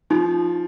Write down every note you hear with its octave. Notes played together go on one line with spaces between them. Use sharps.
F3 D#4